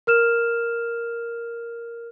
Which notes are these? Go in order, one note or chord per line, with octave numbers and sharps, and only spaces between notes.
A#4 F6 E7